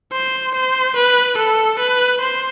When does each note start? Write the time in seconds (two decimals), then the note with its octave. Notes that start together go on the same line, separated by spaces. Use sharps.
0.13 C5
0.55 C5
0.96 B4
1.37 A4
1.79 B4
2.21 C5